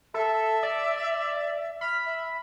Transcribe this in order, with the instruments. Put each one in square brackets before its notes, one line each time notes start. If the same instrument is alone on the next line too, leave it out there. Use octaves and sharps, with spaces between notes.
[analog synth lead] A4 [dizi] E5
[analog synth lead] D5
[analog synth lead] B5 [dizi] F6
[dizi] E5